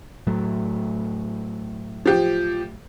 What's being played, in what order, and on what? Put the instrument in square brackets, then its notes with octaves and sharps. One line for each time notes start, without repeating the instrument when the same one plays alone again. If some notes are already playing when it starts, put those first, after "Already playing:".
[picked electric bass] A2 F#3 A3
[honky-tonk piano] F3 G4